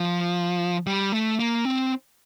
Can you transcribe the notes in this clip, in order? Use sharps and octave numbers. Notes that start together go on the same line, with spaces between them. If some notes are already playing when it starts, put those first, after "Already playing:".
Already playing: F3
G3
A3
A#3
C4